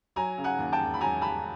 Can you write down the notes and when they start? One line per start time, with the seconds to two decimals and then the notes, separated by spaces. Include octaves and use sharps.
0.16 F#3 G#5 A#5
0.38 C#3
0.44 F#5 G#5
0.59 D#2
0.73 G5 A5
0.79 E1
0.94 B5
1.01 F#3 G#5 A#5
1.21 C#3 A5 B5